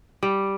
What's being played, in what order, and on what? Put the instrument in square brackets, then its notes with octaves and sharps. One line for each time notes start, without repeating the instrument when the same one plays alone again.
[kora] G3